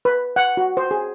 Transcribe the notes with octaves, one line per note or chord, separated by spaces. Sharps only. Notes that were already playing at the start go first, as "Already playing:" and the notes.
B4
F#5
F#4
C5
G#4